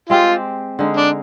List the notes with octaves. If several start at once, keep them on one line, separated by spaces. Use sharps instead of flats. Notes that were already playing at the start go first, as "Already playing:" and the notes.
G#3 C4 F4 G4
D3 G#3 D#4
D4